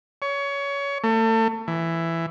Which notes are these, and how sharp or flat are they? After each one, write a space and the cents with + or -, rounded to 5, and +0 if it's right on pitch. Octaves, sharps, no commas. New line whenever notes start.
C#5 +20
A3 +30
E3 +10